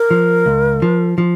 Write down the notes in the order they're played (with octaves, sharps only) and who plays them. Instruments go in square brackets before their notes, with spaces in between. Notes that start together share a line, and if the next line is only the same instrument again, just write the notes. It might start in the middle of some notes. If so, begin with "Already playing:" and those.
Already playing: [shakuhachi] A#4
[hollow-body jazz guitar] F3
C#2
F3
F3